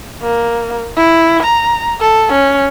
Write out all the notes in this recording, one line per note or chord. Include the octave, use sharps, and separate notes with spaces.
A#3
E4
A#5
A4
C#4